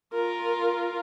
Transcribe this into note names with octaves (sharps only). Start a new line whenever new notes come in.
F4 A#4